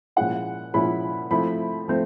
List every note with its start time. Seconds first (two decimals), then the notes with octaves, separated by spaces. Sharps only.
0.16 A#2 F3 G#3 C#4 E4 F#5
0.74 A#2 F3 G#3 C#4 E4 B5
1.31 F3 A3 C4 E4 B5
1.88 F3 A3 C4